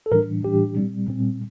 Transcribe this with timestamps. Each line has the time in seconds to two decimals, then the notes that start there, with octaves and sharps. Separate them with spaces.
0.06 A4
0.11 A2 E3 G3 D4 A#4
0.43 A2 E3 G3 D4 G4
0.76 A#2 G3 C4
1.08 A#2 G3 C4